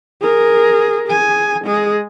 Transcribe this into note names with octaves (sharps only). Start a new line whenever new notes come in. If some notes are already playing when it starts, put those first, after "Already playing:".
G#4 A#4
G#4 G#5
G#3 G#4